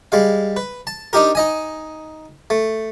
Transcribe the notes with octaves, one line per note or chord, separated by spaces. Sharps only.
G3 G#3 F5
B4
A5
D4 D#4 G4 A#4
D#4 D#5 G#5
A3